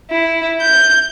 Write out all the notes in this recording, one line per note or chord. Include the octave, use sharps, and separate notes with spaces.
E4
G6